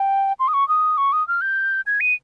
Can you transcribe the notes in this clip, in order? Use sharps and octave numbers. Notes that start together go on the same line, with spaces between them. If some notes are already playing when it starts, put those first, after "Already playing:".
Already playing: G5
C6
D#6
C#6
D#6
C#6
D#6
F6
G6
G#6
D#7